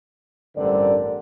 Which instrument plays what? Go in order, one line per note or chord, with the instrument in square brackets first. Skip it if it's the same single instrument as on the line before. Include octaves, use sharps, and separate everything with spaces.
[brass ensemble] A1 G2 D3 C4 A#4 D5